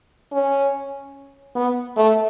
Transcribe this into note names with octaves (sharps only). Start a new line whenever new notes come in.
C#4
B3
A3